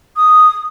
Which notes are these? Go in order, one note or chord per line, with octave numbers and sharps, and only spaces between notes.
D#6